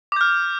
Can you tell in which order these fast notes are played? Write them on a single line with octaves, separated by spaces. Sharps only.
D6 G6 F6